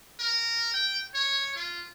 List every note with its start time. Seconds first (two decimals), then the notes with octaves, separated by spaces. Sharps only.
0.20 A#4
0.74 G5
1.14 C#5
1.56 F4